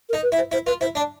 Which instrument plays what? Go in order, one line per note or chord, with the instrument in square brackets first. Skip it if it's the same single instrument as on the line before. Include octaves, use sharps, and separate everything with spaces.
[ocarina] A#4
[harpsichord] D#4
[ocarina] B4
[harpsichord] E4
[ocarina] C5
[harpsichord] E4 [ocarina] C5
[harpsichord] F4 [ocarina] B4
[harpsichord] E4 [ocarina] C5
[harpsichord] D4 [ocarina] D5